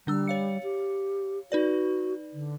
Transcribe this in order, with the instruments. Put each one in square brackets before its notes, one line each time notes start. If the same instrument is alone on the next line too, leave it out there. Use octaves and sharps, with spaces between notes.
[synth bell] D3 D4 E6 [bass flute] G3
[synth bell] C#5 F5 C#7
[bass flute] G4
[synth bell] D#4 B4 D5 [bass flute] F#4
[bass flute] D3